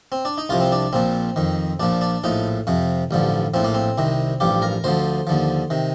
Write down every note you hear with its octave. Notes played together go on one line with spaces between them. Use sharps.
C4
D4
D#4
C2 C3 F3 F4
C4
D4
A#1 A#2 F3 C4
F2 D#3
A#1 A#2 F3 D4
D4
A#1 A2 F3 D#4
F2 C3 F3
A1 G2 D3 F3
A#1 A2 F3 C4
A#3
C4
C2 C3 D#3
A1 G2 F3 G4
A#4
D2 D3 F3 C5
D#2 D3 F3
C3 D#3